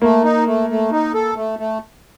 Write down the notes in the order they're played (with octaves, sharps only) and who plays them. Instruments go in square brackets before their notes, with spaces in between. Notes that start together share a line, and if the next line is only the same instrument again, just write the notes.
[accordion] A3 [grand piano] A#3
[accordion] D#4
A3
A3
D#4
A4
A3
A3